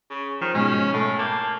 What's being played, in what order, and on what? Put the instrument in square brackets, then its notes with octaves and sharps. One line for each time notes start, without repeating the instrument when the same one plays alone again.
[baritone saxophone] C#3
[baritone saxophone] D#3 [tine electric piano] F3
[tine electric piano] G#2 B2 G#3 [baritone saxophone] C#4
[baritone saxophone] A2 [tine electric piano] A3
[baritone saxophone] A#3 [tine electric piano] A5 D6 G6